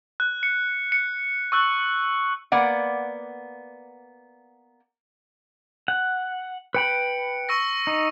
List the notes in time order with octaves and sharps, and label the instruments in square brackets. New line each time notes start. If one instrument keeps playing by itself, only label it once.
[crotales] F#6
C#7
C#7
C#6 E6 F#6
[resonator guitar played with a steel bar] A#3 B3 D5 F#5
[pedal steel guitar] F#5
[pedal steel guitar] B4 G5 B5 [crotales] C#7
[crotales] C#6 E6 A#6
[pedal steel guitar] D#4